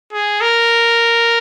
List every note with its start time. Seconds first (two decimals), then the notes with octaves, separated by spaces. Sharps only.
0.13 G#4
0.41 A#4